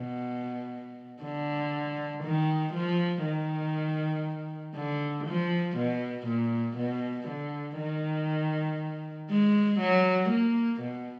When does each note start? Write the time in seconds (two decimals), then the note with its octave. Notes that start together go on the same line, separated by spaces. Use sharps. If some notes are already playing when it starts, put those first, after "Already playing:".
Already playing: B2
1.23 D3
2.24 D#3
2.74 F3
3.25 D#3
4.75 D3
5.27 F3
5.77 B2
6.27 A#2
6.77 B2
7.28 D3
7.78 D#3
9.29 G#3
9.80 F#3
10.30 A#3
10.81 B2